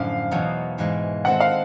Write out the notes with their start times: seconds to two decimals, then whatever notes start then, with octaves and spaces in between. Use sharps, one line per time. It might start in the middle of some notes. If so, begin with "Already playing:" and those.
Already playing: F#2 A2 D3 F3 F5
0.31 E2 B2 F#3 B3 D#4
0.78 G#2 E3 G#3
1.25 D#3 G#3 C4 E4 A4 F#5
1.40 F5